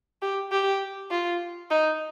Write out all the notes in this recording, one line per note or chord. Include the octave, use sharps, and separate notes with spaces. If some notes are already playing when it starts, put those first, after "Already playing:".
G4
G4
F4
D#4